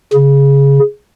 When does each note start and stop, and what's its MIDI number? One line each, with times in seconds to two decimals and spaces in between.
0.14 0.79 49